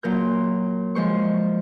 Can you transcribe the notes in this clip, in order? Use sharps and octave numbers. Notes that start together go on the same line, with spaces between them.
A#2 F#3 A#4 G6
F3 G#3 C5 C#6